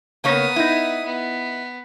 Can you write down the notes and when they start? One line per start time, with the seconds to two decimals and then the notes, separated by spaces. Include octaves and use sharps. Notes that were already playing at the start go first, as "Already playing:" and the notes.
0.24 C#3 A#3 B3 C#5 D#6
0.56 D#4 E4
1.05 B3